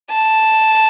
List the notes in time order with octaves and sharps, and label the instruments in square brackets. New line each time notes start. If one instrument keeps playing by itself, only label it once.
[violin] A5